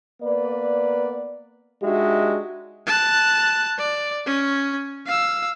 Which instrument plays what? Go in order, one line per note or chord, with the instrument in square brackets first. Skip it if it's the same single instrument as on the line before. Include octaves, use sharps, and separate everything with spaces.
[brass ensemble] A#3 B3 B4 D5
G#3 D4 D#4 F#4 G4 E5
[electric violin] A5 F#6
D5
C#4
F5 E6